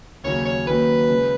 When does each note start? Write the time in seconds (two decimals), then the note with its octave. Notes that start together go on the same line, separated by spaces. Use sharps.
0.23 D#2 C#3 F#3 A#3 C#5
0.45 C#5
0.67 D#2 D#3 F#3 A#3 C#4 B4
1.08 C#3 G#3 C#4